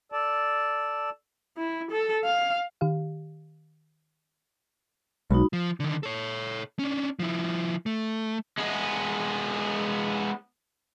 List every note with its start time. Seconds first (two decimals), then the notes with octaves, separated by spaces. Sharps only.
0.12 A4 D5 A5
1.57 E4
1.91 A4
2.25 F5
2.81 D#3 G4 F5
5.31 B1 G#3 D#4 F#4 B5
5.53 F3
5.80 D3 D#3
6.03 A4 C#5
6.79 C#4 D4
7.19 F3 E4
7.86 A3
8.58 G#3 B3